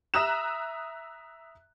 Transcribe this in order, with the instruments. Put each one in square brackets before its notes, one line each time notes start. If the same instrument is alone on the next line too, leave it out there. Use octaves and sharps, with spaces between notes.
[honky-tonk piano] E5 A#5 D#6 E6 F#6 E7